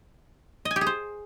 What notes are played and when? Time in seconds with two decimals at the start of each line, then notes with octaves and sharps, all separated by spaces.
0.65 D#5
0.71 G#5
0.76 G4
0.81 G#4
0.87 C5